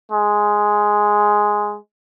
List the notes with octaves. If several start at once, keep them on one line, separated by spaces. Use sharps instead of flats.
G#3